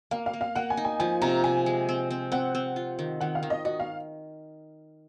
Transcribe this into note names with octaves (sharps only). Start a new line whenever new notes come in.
A#3 F5
F5
A#3
F5
A#3 F#5
G#5
D#4
G#5
F3 G#5
C3 A#5
C3 G#5
G#3
C4
C4
C4 F#5
C4
F4
D#3
D#3 F#5
F5
D#3
D#5
F#4 D#5
F5